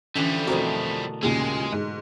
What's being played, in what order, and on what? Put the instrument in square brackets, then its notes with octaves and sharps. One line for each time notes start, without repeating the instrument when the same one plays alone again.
[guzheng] D3 E3 [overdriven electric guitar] F3 G3 [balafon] C#4
[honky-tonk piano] F2 [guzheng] B2 A3 A#4 [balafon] F#4 C5
[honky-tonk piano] D#2 A#2 C#3 [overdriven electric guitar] G#3 [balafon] G#4
[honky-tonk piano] G#2